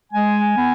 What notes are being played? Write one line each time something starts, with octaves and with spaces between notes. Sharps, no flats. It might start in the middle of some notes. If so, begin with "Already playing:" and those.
G#3 G#5
B3